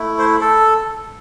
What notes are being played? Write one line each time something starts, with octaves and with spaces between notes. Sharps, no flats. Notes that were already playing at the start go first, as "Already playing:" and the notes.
Already playing: A3 E4
C5
A4